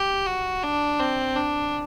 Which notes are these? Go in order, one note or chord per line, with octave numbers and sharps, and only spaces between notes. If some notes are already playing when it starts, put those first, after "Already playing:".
Already playing: G4
F#4
D4
C4
D4